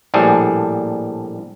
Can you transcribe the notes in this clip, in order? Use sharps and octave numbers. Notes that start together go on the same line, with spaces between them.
A#1 A2 G3 G#4 A4